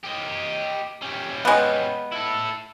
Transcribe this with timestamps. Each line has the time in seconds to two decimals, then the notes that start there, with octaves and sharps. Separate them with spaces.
0.04 G4 D#5
1.03 C#4 G4
1.45 G#3 B3
2.12 E4 A4